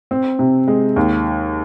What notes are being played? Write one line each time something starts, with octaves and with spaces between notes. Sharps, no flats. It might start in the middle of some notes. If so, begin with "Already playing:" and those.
C4
C3
G#3
D#2